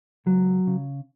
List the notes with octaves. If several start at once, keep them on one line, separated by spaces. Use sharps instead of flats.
C#2 F#3
C#3